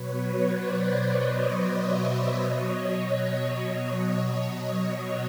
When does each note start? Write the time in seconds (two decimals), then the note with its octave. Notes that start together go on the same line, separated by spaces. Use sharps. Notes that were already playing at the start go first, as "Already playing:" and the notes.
Already playing: B2 F#3 B4 C#5
0.52 C5 D5
1.14 C#5 D#5
1.77 D5 E5
2.39 B2 F#3 C#5 D#5